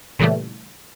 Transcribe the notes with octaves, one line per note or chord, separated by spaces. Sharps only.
A#2 C#3 E3 G3 A3